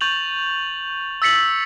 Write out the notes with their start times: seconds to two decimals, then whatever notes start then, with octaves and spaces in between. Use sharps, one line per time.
0.01 C#6 G6 A6 F7 F#7
1.22 E6 A6 B6 C#7 F#7